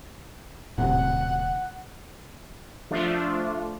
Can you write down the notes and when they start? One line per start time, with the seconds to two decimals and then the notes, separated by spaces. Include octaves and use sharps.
0.78 D#1 A2 C3 F#5
2.91 F3 A3 D4 F4